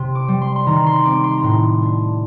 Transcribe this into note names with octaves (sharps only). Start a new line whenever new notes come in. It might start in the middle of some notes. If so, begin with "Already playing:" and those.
Already playing: C3 C6
D6
G3
C6
C6
D#3 A#5
C6
C4 D6
C6
A#5
A2 C6
D4